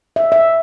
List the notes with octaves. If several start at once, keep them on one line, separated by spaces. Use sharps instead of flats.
E5
E5